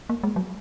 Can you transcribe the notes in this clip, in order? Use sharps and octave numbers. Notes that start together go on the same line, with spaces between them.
A#3
G#3
F#3